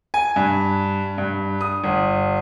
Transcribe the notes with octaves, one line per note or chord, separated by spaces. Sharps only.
G#5
G2
G2
D#6
G1